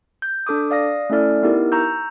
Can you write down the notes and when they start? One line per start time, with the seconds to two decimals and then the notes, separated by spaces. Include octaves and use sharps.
0.22 G6
0.46 D4 A4 D6 D#6
0.71 D5 F5 D#6 A#6
1.10 A3 C#4 E4 A4 D5 F6
1.43 B3 D#4 E4 G4 A#4
1.72 A#5 C#6 E6 G6